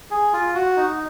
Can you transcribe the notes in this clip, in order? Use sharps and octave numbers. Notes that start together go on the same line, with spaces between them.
G#4
F4
F#4
D#4